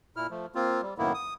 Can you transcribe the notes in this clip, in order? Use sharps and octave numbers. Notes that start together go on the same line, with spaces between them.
A#2 E4 F6
F3 A3
A#3 C4 F4
G3
F#2 A2 D#3 A#3 B3 E4
D#6